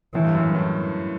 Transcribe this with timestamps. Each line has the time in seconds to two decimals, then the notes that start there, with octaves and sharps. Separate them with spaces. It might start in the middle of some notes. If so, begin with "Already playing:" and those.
0.14 A2 E3
0.25 G2
0.35 F#2
0.45 G2
0.55 A2